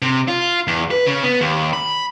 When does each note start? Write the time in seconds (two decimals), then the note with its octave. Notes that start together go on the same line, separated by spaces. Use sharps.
0.02 C3
0.28 F4
0.67 E2
0.91 B4
1.06 C#3
1.23 B3
1.41 D#2
1.73 B5